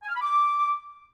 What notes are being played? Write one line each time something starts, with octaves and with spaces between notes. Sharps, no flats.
G#5
F6
B5
D6